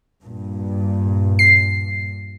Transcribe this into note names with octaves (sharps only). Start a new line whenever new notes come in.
G2 A#2
C7